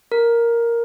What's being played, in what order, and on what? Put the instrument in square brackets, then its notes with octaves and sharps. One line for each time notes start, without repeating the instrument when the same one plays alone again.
[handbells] A#4